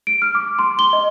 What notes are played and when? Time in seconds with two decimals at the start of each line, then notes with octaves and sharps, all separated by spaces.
0.07 D7
0.22 F6
0.35 D6
0.59 C6
0.79 G7
0.93 D#5